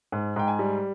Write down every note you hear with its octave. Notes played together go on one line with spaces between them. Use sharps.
G#2
G#2 G5
G#5
G3